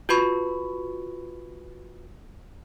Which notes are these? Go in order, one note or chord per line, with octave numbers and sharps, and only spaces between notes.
F4 F#4 B4 B5 C#6